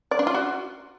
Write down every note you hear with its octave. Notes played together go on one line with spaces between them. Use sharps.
D5
D4
F4
F#4